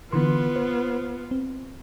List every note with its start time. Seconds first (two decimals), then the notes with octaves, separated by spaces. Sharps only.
0.13 D3 E3 B3 F4 C6
0.56 C5
1.31 C4